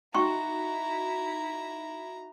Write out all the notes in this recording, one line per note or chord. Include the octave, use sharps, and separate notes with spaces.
D#4 E4 F#4 G5 A#5 C6 C#6